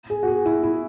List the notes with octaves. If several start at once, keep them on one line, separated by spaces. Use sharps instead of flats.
G#4
F#4
G#4
E4
E4